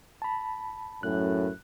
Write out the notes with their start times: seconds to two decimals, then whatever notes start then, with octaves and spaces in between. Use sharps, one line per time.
0.22 A5 B5
1.03 F#2 A2 F#6